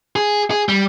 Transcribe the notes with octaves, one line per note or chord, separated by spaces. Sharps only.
G#4
G#4
G3